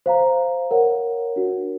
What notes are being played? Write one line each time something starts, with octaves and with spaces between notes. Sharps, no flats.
C5 F5 A#5
A#4 C#5 F#5
D4 F#4 A#4